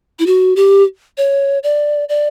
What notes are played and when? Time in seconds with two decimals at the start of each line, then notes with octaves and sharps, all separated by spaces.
0.19 E4
0.26 F#4
0.56 G4
1.18 C#5
1.63 D5
2.09 D5